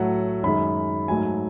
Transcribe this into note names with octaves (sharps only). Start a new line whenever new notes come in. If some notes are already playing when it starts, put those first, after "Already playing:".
Already playing: A2 F#3 A3 F#5
F#2 D#3 G#3 B5
G#2 F#3 A3 G#5